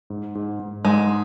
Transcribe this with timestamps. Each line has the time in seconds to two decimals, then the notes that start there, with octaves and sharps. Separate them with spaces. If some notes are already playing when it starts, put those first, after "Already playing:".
0.10 G#2
0.35 G#2
0.60 G#2
0.85 G#2 G#3